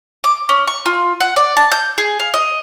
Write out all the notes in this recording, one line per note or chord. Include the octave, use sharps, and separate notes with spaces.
D6
C#4
C#6
F4
F#5
D5
A5
G6
G#4
F5
D#5